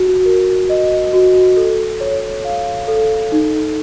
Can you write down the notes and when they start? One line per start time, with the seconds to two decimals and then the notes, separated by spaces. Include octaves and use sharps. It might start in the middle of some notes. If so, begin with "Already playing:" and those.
Already playing: F#4
0.26 A#4
0.69 D#5
1.13 F#4
1.57 A4
2.01 C#5
2.45 F5
2.88 A4
3.32 D#4